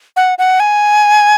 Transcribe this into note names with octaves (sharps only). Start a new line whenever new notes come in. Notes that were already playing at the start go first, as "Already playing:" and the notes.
F#5
F#5
G#5